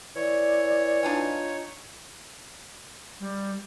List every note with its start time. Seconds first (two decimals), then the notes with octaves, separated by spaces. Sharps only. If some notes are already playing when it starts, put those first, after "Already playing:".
0.15 E3 C#5 D5
1.03 D4 D#4 F4 G#5
3.20 G3